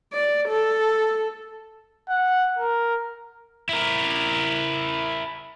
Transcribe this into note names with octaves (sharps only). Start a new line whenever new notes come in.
D5
A4
F#5
A#4
E4 A#4